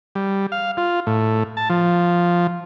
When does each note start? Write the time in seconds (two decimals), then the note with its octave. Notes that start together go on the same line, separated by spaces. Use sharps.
0.15 G3
0.52 F5
0.77 F4
1.07 A2
1.57 A5
1.70 F3